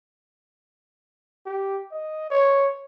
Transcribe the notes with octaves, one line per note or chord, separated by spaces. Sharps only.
G4
D#5
C#5